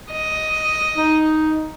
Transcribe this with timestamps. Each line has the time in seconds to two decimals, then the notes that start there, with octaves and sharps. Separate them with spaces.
0.12 D#5
0.97 D#4